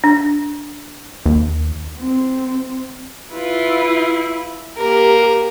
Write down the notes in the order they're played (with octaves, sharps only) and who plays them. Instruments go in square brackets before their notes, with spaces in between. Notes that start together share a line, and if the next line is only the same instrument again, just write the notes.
[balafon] D4
[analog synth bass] D#2
[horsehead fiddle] C4
[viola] E4 [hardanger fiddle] F4 B4
[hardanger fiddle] A#3 A#4 [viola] G4